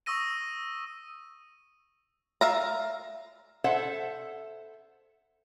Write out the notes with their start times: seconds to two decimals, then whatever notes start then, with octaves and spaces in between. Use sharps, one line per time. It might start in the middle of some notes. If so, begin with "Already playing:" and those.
0.06 C#6 D#6 E6 A#6 D#7
2.41 E5 F5 A#5
3.64 A4 C5 E5 F#5